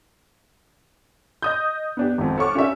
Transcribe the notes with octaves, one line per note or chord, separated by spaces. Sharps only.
D#5 D#6 G6
B3 D4 G4
G#1 F2
A4 C#5 F#5 C#6 D6 F6
C#4 F4 G4 A#4 D5 E5